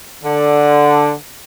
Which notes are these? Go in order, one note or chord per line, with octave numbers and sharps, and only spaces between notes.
D3